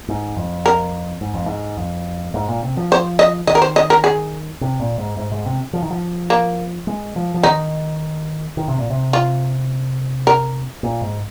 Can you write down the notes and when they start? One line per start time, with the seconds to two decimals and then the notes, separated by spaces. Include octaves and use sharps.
0.09 G#2
0.36 F2
0.66 A#4
1.21 G#2
1.34 F2
1.46 G#2
1.78 F2
2.34 G#2
2.48 A#2
2.63 C3
2.77 F3
2.92 C5
3.19 D#5
3.47 D#3 D#5
3.55 A#4
3.62 C5
3.76 D#5
3.90 A#4
4.04 G#4
4.61 C3
4.80 A#2
4.98 G#2
5.17 G#2
5.32 G#2
5.46 C3
5.73 F3
5.83 D#3
5.91 F3
6.30 A#3
6.87 G#3
7.16 F3
7.34 F3
7.43 D#3 D#4
8.57 D#3
8.68 C3
8.79 A#2
8.90 C3
9.13 F4
10.27 A#4
10.83 A#2
11.02 G#2